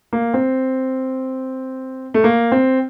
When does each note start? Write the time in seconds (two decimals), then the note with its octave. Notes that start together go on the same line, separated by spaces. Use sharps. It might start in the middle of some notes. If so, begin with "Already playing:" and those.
0.13 A#3
0.34 C4
2.14 A3
2.24 A#3
2.52 C4